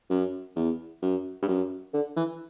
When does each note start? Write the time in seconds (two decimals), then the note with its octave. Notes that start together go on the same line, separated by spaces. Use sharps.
0.10 F#2
0.56 E2
1.02 F#2
1.42 G2
1.48 F#2
1.94 D3
2.17 E3